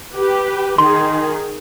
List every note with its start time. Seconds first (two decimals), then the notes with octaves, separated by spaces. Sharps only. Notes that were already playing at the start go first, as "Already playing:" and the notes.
0.13 G4 B4
0.78 D#3 G#4 C6